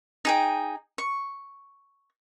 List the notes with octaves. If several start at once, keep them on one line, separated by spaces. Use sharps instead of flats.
D#4 G#4 G5
C#6